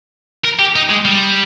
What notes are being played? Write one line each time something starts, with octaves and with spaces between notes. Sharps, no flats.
A#4
G4
D#4
G#3
G3